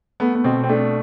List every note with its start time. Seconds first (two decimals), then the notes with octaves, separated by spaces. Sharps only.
0.20 A3 B3
0.35 B3
0.44 B2 C4
0.64 C4
0.69 A3 D4